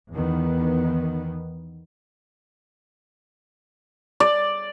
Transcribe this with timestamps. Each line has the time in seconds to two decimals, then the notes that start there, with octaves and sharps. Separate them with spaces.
0.13 E2 D#3 B3
4.20 D5